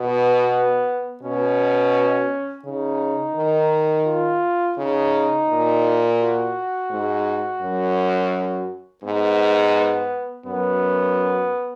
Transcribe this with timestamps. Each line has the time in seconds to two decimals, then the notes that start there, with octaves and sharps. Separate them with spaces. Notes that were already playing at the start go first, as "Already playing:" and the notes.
Already playing: B2 B3
1.23 B2 C#4
2.64 C#3 D#4
3.35 D#3
4.06 F4
4.77 C#3 D#4
5.49 A#2
6.20 F#4
6.90 G#2
7.62 F#2
9.03 G#2 B3
10.46 F#2 B3